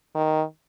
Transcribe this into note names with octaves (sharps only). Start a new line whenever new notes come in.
D#3